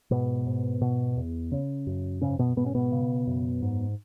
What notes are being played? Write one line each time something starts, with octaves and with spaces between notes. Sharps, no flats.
G#2 B2 B3
G#2
B2
E2
C#3
F#2
G#2 C#3 C#4
B2 B3
G#2 B2 B3
C#4
B2 B3
C#3
F#2
G#2